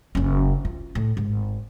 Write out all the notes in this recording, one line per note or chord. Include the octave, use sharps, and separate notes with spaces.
F#1 C#4
F4
A2
G#1